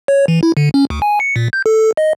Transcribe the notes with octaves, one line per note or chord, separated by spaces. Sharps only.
C#5
E3
E4
D3
C#4
D2
G#5
C#7
A#2
G6
A4
D#5